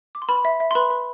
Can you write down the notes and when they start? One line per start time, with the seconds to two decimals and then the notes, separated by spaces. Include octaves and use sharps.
0.15 D6
0.22 C6
0.29 B4 B5
0.45 E5
0.60 E5
0.71 C6
0.75 B4 B5
0.91 B4